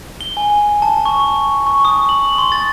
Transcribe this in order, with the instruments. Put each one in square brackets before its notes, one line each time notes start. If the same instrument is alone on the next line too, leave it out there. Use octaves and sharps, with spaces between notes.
[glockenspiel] G7
G#5
A5
C#6
C#6
D#6
F#7
C6
A6